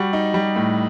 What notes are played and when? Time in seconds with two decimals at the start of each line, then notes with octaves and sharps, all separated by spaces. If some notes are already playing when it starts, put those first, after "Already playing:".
Already playing: G3 F#4
0.13 D#4
0.34 G3
0.56 A2